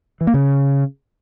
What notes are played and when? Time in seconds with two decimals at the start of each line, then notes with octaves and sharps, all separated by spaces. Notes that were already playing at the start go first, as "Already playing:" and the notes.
0.21 E3
0.27 A#3
0.34 C#3